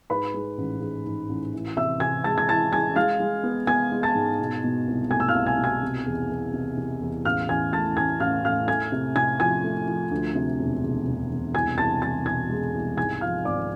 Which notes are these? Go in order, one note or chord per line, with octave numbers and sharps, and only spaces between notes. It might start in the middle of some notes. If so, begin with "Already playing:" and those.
G#2 B4 B5
G#3
A1
G#2
G#2
A1
E3
C3 E5 E6
C3 G#5 G#6
G#3 A5 A6
G#6
E3 A5 A6
G#3 G#5 G#6
G#3 F5 F6
G#3
B3
B3 G#5 G#6
G#3
A5 A6
G#2
B2
B2
C2
A3 G#5 G#6
E6
F5 F6
C2
G#5 G#6
B2
G#5 G#6
C3
E2
E2
C3
C3
E2
A1 F5 F6
A1 G#5 G#6
A2 A5 A6
A1 G#5 G#6
A1 F5 F6
A2 F5 F6
A3 G#5 G#6
C3
C3 G#5 G#6
F3 G#5 G#6
A3
F3
D2
C3
E1
E1
E1
E1
C2 G#5 G#6
C2 A5 A6
C2 A5 A6
B2 G#5 G#6
G#3
C2
G#2 G#5 G#6
F3 F5 F6
G#1 D5 D6